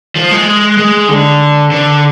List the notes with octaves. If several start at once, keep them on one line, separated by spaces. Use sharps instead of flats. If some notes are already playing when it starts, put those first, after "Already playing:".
F3
G#3
G#3
D3
D3